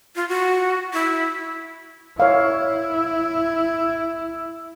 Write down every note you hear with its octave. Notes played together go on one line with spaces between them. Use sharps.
F4
F#4
E4
E4 C#5 F5